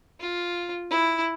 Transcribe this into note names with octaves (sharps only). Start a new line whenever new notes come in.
F4
E4